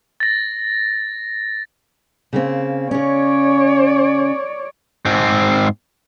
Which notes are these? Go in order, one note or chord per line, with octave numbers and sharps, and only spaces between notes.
A6 A#6
C#3 A#3 C4
C#3 C#4 C#5 D5
G#2 C4